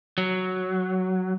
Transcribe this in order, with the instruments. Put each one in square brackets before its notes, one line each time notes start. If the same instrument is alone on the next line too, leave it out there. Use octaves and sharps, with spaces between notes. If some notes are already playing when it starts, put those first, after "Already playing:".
[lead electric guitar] F#3